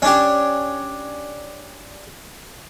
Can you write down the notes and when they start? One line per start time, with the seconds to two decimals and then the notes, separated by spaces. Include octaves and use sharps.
0.02 C#4 D4 G4